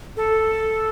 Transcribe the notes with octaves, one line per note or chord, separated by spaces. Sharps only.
A4